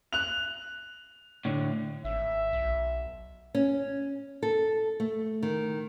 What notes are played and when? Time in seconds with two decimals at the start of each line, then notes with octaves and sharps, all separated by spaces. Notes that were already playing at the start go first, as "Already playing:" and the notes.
0.13 F#6 F7
1.45 A2 D3
2.05 G#1 E5
2.53 B1
3.55 C#4
4.43 A4
5.00 A3
5.43 D#3